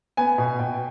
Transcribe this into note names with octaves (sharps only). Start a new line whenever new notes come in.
B3 G#5
B2
B2 G5